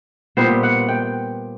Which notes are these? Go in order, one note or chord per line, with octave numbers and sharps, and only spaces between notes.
A#2 G3 B3 C5
F#5
G5